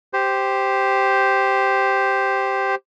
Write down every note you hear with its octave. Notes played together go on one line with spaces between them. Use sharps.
G4 C5